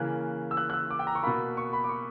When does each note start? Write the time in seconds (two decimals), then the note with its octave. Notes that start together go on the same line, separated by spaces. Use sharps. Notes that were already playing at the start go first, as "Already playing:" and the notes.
Already playing: C#3 E3 A#3 F#6
0.51 E6
0.57 F#6
0.70 F#6
0.73 E6
0.91 D6
0.99 G5
1.07 A#5
1.15 C#6
1.23 B2 A#3 B5
1.57 C#6
1.73 B5
1.84 D6
1.89 C#6